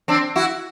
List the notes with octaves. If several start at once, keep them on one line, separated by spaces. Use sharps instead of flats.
C4 D4
E4 F#4